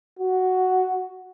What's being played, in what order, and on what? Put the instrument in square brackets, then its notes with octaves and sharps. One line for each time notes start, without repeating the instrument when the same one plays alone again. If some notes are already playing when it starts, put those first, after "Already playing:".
[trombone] F#4